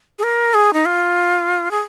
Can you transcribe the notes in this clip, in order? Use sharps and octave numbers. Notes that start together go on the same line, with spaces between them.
G#4
A#4
G#4
D#4
F4
G#4